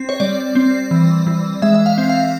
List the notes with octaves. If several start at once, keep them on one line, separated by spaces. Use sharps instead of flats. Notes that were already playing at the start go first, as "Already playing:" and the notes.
Already playing: C4
C#5
G3 D5
C4
E3
E3
G#3 E5
E5
F5
C4
F5